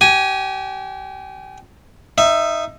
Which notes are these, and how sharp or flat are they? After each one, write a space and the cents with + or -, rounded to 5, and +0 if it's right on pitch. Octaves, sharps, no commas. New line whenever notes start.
G4 -30 G#5 +0
D#4 +0 E5 +20